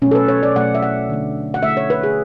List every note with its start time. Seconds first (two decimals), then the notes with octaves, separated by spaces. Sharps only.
0.02 B2 F#3 A3 C#4
0.11 A4
0.15 B4
0.28 C#5
0.43 D5
0.56 B2 F#3 A3 F#5
0.75 E5
0.83 F#5
1.10 D3 A3
1.54 F#5
1.63 D3 A3 E5
1.77 C#5
1.90 B4
2.03 G#4